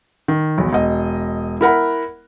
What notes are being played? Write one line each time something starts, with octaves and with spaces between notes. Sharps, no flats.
D#3
B1 E2
E1 D#5
E4 A#4 F#5 B5